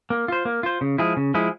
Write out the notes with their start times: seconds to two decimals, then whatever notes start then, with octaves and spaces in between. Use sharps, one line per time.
0.10 A#3
0.28 F4 C5
0.45 A#3
0.63 F4 C5
0.81 C#3
0.98 F3 G#3 E4 G#4
1.17 C#3
1.34 F3 G#3 E4 G#4